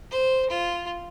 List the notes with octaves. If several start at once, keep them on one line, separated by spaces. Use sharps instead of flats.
C5
F4